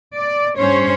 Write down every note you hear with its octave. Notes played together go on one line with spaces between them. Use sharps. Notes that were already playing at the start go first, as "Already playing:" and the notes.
D5
G2 C#4 C5 C#5